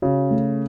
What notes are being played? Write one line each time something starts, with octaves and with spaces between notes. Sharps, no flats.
C#3 F#4
A3